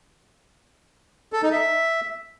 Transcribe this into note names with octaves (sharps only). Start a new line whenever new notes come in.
A4
D#4
E5